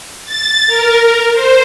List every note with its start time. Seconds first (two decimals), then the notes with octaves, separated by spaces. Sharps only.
0.25 A6
0.67 A#4
1.32 C5